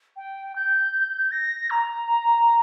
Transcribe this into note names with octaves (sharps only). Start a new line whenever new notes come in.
G5
G6
A#6
A#5